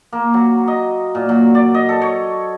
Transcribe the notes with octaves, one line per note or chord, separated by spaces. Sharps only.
A#3
F#3
D#5
A#2
F#3
D5
D#5
A4
C#5